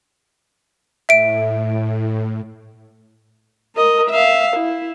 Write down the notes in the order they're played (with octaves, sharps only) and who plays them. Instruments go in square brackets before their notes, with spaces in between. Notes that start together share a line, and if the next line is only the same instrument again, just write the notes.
[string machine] A2 [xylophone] E5 D7
[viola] A#4 D#5
E5 F5
E4